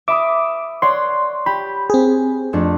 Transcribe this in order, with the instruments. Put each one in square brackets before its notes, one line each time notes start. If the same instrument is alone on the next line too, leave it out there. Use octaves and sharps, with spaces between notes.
[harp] E5 B5 D#6 [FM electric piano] D6
[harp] C#5 D5 F#5 [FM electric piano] C6
[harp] G4 [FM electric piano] B5
[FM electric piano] C4 G#4
[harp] F2 A3 D4